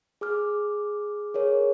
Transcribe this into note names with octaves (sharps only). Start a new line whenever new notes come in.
G#4 D6 F6
G#4 A#4 C#5